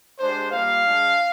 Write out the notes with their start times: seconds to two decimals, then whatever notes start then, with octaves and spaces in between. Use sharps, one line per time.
0.19 G#3 D4 G4 C5
0.52 G3 A#3 F4 F5
0.84 G#3 D4 F4